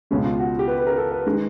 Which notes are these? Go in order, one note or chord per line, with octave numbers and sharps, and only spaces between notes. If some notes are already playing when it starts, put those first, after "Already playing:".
C#2 B2 G#3 C#4
F4
F#4
G4
B4
B4
A#4
A4
B4
D#3 G#3